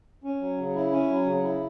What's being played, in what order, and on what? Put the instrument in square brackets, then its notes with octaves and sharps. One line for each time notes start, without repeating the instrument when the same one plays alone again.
[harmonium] C#4
F#3
C#3
E4
C#4
F#3
C#3
E4